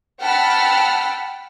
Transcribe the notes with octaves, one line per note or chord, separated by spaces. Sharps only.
F#5 G5 A5 B5 E6 F6